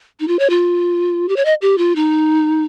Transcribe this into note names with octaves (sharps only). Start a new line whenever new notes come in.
D#4
F4
C#5
F4
G4
C#5
D#5
G4
F4
D#4